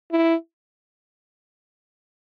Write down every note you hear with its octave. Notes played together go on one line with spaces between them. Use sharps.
E4